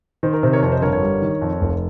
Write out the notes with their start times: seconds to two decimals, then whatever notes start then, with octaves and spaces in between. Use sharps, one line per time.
0.23 D#3 C5
0.33 A#4
0.43 C3 C5
0.52 A#4 C#5
0.63 F2 A#4 C#5
0.72 C5 D#5
0.82 G1 A#4 C#5
0.93 A#4 C#5
1.02 G3
1.22 D#3
1.42 F2
1.61 F1